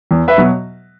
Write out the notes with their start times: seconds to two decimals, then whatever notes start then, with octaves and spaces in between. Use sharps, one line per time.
0.11 E2
0.28 B4 E5
0.36 B2 F#3 B3